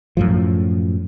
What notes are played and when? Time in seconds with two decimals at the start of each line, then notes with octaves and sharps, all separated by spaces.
0.17 F#2 A2 F3